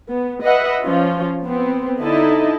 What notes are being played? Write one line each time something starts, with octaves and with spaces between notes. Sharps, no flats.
B3
B4 D#5 E5 F#5
F3 C#4 F4
B3 C4
D3 D#4 E4 D#5 A5